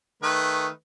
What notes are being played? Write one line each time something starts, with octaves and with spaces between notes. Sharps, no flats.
D#3 A3 B4